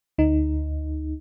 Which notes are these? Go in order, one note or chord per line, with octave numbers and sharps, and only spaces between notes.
D2 D#4